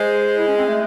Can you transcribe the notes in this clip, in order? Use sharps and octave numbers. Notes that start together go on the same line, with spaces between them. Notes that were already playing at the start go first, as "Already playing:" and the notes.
Already playing: G#3 C5
E4
C#4
C4
A3